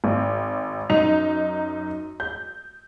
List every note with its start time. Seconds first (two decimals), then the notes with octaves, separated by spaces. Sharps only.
0.04 G#1
0.90 F#2 D#4 F7
2.20 G6